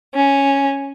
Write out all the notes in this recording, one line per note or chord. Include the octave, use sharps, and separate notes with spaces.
C#4